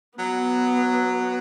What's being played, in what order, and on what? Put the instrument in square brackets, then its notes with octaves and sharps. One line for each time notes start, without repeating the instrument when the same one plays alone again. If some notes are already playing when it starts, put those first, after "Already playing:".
[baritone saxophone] F#3 [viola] B3